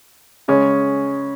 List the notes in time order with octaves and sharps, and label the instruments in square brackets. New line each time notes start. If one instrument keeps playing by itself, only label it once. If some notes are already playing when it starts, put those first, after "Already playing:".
[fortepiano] C#3 G#3 C#4